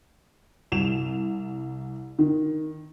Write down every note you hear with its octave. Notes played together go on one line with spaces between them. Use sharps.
C2 E7 F7
D#3